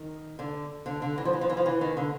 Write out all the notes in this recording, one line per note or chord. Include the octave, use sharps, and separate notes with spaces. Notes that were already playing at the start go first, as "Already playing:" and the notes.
Already playing: D#3
D3
D3
D3
E3
F3
E3
F3
E3
F3
E3
D#3
D3